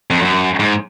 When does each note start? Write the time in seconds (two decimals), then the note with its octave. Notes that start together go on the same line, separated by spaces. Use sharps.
0.10 F2
0.22 F#2
0.60 G#2